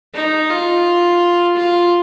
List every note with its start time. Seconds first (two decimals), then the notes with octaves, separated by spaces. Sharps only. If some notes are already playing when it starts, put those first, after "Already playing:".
0.14 D#4
0.50 F4
1.57 F4